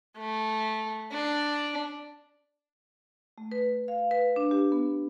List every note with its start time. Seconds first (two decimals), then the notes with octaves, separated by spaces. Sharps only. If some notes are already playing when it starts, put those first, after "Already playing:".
0.19 A3
1.12 D4
3.38 A3
3.52 B4
3.88 F5
4.11 B4
4.36 D4
4.51 G4
4.72 B3